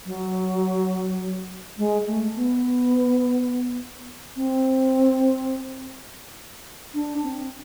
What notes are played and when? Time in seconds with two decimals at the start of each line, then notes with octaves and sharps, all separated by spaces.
0.06 F#3
1.78 G#3
2.07 A3
2.36 B3
4.36 C4
6.94 D4
7.23 C4